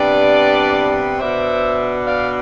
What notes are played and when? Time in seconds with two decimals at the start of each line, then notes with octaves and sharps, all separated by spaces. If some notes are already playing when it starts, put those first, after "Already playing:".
Already playing: C3 G3 B3 D4 B4 D5
1.19 B2 B3 D4 C5 E5
2.06 D5 F5